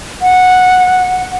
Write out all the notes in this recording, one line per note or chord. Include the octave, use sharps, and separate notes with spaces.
F#5